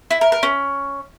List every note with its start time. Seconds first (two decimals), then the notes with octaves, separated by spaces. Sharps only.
0.11 E4
0.21 A#4
0.32 A#4
0.43 C#4